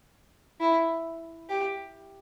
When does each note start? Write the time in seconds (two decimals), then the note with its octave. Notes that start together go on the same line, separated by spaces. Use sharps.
0.60 E4
1.49 G4